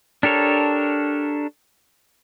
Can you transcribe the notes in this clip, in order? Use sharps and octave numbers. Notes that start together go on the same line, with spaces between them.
D4 G4 A4 A#4 C#5